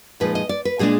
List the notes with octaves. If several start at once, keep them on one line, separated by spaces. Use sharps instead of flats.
A#2 F3 G#3 D#4 B4
D#5
D5
B4
A#2 G#3 D4 G#4